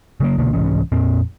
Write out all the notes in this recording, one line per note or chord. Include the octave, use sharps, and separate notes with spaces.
C#3 F#3 A#3
C2 B2 D3 A#3
C2 G#2 E3 C#4
F2 A#2 C4